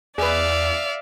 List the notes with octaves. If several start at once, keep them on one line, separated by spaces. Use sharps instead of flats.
E2 G#4 B4 D5 E5 F5